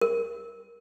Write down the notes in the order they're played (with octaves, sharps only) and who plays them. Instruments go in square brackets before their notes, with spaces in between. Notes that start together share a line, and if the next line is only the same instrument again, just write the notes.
[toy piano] A#4